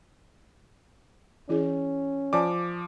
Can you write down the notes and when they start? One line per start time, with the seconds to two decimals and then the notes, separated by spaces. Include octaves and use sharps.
1.49 E3 C#4 E4 G#4
2.33 F3 D5 G#5 A5 D6